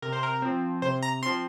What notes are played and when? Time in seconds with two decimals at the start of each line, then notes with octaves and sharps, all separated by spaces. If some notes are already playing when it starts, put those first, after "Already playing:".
0.02 C3 A#4
0.12 C5
0.23 A#4
0.42 F3 C4
0.82 C3 C5
1.03 A#5
1.22 C4 C6
1.26 F3